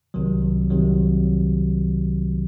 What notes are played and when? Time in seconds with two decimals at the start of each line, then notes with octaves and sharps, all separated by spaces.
0.14 C2 C3 D#3 F#3
0.70 C2 C3 D#3 F#3